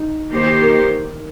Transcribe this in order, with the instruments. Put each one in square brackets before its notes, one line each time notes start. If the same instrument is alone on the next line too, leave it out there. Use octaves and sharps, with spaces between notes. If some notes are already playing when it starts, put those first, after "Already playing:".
Already playing: [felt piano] D#4
[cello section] D#3 A#3 D#4 G4 C5
[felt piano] A#4